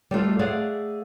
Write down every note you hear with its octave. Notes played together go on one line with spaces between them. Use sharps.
G3 A3 F4 A4
A3 G#4 D5 F5 F#5